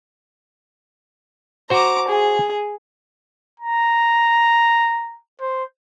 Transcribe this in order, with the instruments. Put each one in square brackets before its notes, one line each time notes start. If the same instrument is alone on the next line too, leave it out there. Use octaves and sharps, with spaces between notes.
[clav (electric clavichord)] F#4 C5 [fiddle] A#5 D6
[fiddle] G#4
[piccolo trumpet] A#5
C5